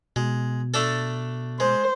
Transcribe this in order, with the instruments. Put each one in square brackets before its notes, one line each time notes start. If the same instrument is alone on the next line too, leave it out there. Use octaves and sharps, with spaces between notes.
[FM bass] B2 [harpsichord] G#3
[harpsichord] A3 D4 A4
[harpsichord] G#3 [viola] C5